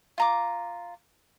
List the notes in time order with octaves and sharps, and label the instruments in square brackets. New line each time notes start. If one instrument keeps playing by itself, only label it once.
[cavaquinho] F4 A#5 D6